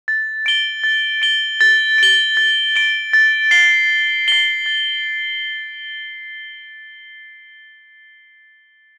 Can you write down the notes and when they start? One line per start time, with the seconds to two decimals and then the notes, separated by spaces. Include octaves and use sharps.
0.08 A6
0.46 D7 G7
0.84 A6
1.22 D7 G7
1.61 A6
1.98 D7 G7
2.37 A6
2.76 D7 G7
3.13 A6
3.51 C7 G7
3.90 A6
4.28 C7 G7
4.66 A6